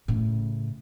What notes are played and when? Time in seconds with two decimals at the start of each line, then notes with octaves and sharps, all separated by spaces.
0.08 A2 C#3